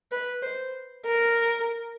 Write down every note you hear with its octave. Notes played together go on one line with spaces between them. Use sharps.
B4
C5
A#4